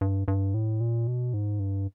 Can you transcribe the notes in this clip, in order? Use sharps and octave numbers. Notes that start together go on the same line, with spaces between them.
G2
G2
A2
A#2
B2
G#2
G2